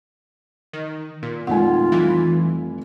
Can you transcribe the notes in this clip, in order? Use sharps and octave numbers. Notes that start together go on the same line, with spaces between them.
D#3
A#2
F1 D#3 G#3 F4 F#5 G#5
E3 G3